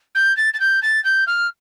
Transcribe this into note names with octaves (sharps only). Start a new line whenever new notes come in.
G6
A6
A6
G6
A6
G6
F6